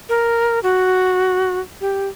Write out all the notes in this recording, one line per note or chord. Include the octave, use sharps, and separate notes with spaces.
A#4
F#4
G4